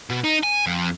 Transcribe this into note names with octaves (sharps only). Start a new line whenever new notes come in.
B2
D#4
G#5
F2